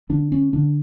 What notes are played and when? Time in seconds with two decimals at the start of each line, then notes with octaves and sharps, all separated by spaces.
0.09 D3 D4
0.32 C#4
0.53 D3 D4